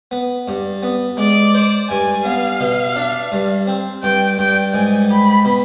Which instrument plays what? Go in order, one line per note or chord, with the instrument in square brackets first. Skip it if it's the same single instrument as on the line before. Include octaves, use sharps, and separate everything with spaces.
[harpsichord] B3
G2
B3
[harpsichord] G#3 [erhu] D5
[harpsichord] C5
[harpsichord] G2 [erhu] G#5
[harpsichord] B3 [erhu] F5
[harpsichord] B2
D4
G2
C4
[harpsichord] G2 [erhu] G5
[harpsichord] G2 [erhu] G5
[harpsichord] G#2 [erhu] G#5
[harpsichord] G4 [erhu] B5
[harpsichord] B2